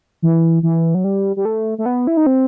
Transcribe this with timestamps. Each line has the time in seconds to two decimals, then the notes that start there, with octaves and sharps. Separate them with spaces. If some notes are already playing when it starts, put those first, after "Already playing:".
0.22 E3
0.63 E3
0.95 F#3
1.04 G3
1.36 G3
1.45 A3
1.78 A3
1.86 B3
2.07 E4
2.17 D#4
2.26 C4